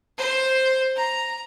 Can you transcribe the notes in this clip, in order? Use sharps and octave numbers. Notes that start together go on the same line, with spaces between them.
C5
A#5